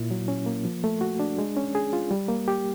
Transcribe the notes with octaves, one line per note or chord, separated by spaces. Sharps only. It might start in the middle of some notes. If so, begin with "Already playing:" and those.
Already playing: A#2 E4
F#3
C#4
A#3
F3
A3
F#4
D4
G#3
C#4
G#4
F4
G3
A#3
G4